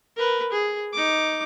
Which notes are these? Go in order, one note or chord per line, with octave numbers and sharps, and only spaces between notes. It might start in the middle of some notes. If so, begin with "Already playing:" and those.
A#4 B4
G#4
D#4 D6